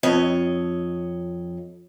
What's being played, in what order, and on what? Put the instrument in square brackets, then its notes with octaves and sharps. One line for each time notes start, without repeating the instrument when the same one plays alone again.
[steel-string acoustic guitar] F2 C#5 D#5